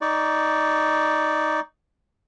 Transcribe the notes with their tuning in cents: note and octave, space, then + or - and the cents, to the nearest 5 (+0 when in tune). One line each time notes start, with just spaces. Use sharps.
D#4 +5 D5 +0 C#6 +30